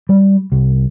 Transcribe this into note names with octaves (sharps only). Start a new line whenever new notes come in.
G3
C2